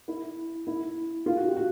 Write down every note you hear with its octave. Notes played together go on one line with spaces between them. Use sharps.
E4
E4
F4
F#4
G4
F#4